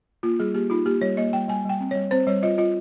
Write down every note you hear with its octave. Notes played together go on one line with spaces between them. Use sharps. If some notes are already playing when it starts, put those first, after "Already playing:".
A#3 F4
G3 G#4
A#3 G4
D#4 F4
A#3 G4
G3 C#5
A#3 D#5
G3 G5
G3 G#5
G3 G5
C4
C#5
G3
C4 C5
G3 C#5
F4 D#5
F4 D#5